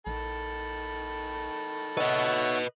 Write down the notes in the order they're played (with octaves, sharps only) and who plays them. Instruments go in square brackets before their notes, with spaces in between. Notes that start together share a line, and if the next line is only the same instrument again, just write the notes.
[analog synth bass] A#1 [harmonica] D#3 A4 B5
[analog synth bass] D#4 [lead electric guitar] B4 D#5 [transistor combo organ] C#5 E5 F#5